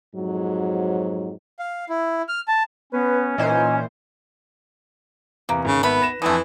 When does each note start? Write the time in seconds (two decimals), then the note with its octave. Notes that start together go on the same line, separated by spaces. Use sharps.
0.16 F2 G#2 F#3
1.59 F5
1.89 E4
2.29 F6
2.48 A5
2.92 B3 C#4 B4
3.38 A#2 E3 D#4 C5 G#5
5.49 E2 C3 A#3
5.65 G#1 C#3
5.83 A3 B3 B5
6.01 B4 A#6 E7
6.22 F2 D3 E3 A3 G#5 D#6